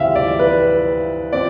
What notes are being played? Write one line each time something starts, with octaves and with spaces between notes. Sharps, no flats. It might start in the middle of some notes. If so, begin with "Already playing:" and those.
Already playing: D2 C3 E3 A3 C4 E5 F5 G5
D5
B4
F3 C4 D5